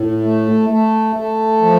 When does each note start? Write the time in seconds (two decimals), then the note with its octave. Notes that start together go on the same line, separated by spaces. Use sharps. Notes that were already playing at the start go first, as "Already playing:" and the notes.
Already playing: A2
0.22 A3
0.69 A3
1.16 A3
1.62 F3